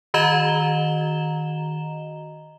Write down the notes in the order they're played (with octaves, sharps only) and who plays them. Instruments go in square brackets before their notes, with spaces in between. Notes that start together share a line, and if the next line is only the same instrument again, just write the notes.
[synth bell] D#3 F#4 D#5 A#5 E7 G7